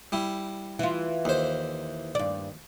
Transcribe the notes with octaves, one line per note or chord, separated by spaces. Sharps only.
G3 E4
E3 F4
D#2 C5
G2 D5